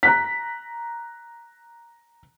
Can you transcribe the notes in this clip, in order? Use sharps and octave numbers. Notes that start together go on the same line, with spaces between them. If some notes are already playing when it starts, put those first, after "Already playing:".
A#5 F#6 B6